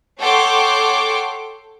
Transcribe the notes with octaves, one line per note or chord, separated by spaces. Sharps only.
A4 C#5 F#5 G5 C6 D6